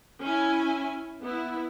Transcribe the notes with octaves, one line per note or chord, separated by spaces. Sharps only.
C#4 E4 G#5
B3 E4